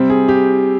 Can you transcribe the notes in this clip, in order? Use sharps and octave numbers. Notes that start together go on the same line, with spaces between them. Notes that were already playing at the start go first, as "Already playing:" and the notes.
Already playing: C3 G3 C4
G#4
G4